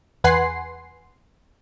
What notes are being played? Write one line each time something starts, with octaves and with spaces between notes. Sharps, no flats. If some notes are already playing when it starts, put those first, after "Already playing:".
E2 B4 F#5 G#5 C6 C7